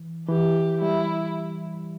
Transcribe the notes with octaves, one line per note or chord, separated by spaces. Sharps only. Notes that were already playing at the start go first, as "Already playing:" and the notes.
Already playing: E3
E3 G4
G3 E4